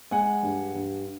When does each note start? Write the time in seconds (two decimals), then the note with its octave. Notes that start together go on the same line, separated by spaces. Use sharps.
0.11 G#3 F#5 G#5
0.43 G2
0.75 G2